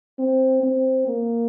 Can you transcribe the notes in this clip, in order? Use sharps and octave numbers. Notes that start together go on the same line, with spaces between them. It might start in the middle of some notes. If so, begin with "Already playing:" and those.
C4
C4
A#3